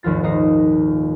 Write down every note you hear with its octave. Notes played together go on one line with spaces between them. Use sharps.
G#1 D#2 F3 F4 A6
D#1 D#2 D#4 D#6 A#6 C7